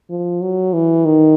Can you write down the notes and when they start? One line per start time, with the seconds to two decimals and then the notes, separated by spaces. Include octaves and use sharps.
0.10 F3
0.42 F#3
0.73 E3
1.05 D#3